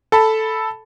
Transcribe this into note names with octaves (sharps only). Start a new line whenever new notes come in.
A4 A5 B5